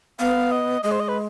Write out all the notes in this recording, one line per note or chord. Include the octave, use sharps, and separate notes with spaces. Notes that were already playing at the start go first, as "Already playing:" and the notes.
B3 F5
D#5
G#3 D#5
C5
D#5
B4